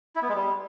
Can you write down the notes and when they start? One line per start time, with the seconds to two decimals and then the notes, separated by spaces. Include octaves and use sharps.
0.16 E4
0.22 B3
0.29 G#3
0.35 G3